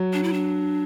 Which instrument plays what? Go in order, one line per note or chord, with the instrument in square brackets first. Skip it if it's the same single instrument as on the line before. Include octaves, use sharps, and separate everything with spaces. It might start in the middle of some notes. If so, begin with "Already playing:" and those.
Already playing: [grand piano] F#3
[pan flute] D4
E4
D4